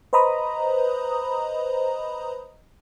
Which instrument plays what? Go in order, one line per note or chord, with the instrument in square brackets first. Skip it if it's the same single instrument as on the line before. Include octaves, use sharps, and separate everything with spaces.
[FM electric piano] B4 C5 D#5 A#5 B5 D#6